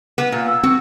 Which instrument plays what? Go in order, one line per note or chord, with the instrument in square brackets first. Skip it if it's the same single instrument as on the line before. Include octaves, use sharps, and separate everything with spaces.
[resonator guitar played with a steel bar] B3
A#2
[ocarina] E6
[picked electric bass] C4 [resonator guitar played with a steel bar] F#4